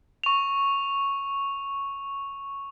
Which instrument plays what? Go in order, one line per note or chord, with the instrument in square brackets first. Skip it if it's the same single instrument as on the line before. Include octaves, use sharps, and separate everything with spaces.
[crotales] C#6 F7